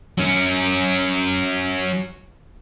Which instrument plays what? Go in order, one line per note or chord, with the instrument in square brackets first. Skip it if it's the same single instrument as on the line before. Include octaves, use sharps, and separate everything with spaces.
[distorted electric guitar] F#3 C#4